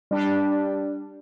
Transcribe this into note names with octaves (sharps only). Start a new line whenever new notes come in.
G3 D4